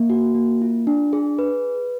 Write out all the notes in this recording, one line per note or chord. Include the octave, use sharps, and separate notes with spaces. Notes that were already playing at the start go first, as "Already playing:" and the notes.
Already playing: A#3
F#4
A#3
F4
D4
G#4
B4